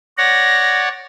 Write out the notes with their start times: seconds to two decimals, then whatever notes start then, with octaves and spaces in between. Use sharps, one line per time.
0.18 C#5 D5 F#5 A#6